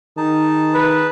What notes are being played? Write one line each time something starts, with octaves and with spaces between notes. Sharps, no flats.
D#3 D#4 G#4 A5
B4